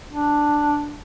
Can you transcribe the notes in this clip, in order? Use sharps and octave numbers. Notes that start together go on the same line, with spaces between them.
D4